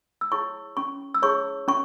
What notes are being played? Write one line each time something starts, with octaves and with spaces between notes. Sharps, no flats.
E6
E4 G#4 C#5 C#6
C#4 C#6
E6
E4 G#4 C#5 C#6
C#4 C#6